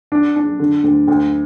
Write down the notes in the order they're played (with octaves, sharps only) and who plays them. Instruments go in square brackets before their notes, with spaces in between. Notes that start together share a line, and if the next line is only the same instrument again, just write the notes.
[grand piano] D4
D4
D3
D2
D2